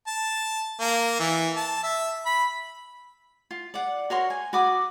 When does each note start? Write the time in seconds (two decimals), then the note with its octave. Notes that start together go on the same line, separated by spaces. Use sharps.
0.07 A5
0.80 A#3
1.20 E3
1.56 A5
1.84 E5
2.26 B5
3.51 F4
3.74 D5 F#5
4.10 F#4 A#4 C#5 C6
4.30 G#5
4.53 F#4 B5 D6 D#6